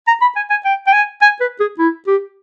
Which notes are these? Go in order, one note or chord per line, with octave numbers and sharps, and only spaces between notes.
A#5
B5
G#5
G#5
G5
G5
G#5
G#5
B4
G#4
E4
G4